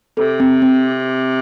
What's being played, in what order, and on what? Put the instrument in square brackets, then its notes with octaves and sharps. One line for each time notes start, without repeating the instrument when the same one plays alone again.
[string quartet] C3 [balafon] A4
[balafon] C4
C4